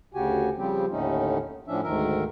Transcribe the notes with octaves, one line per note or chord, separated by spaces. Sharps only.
D2 C#3 F#4 G4 G#5
C#3 F3 G3 C4 G4
D#2 A2 D3 A3 C#4 D#4
A2 F3 C#4 D4 E5
D2 G#2 D#3 A#4 E5